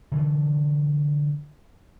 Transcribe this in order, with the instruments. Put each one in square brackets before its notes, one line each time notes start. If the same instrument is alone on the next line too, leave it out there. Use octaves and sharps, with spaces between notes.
[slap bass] D3 E3 F3